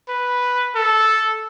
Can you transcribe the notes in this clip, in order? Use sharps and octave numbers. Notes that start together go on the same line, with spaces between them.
B4
A4